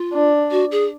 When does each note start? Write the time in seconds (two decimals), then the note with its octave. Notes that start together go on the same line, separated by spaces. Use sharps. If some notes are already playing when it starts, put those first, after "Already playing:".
Already playing: F4
0.13 D4
0.51 F#4
0.71 G#4